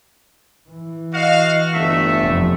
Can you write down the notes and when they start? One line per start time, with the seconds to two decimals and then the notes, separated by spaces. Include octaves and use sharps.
0.69 E3
1.14 F#4 D#5 F5
1.74 G1 E2 A3 E5
2.18 F1 F2